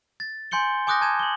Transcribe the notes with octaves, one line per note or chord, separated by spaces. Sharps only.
A6
G#5 C6 G6 C#7 G7
G#5 D6 D#6 F#6 G6 A#6
A5 G#6 E7
F#7 G7